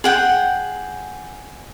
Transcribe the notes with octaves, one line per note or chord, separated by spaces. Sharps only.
G#4 F#5 G5